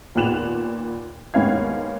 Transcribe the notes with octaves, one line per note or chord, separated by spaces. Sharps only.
D#2 A#2 B3 F#6 E7 F7
D#2 G#2 B3 C#4 F5 G#6